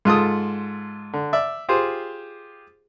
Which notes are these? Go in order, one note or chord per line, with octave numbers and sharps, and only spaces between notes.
G#2 F4 A4 D#6
D3
D5 E5
F4 G4 G#4 C5